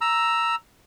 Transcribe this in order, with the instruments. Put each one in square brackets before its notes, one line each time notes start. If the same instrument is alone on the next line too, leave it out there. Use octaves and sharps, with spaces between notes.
[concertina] A#5 E6